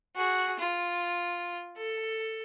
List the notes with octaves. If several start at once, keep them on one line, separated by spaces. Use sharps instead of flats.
F#4 G#4
F4
A4